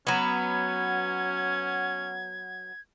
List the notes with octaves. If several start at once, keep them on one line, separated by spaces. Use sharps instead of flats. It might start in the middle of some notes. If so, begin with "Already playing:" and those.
F#3 B3 C#4 G#6